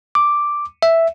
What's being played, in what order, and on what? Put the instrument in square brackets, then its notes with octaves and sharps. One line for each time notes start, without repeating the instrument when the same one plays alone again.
[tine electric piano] D6
E5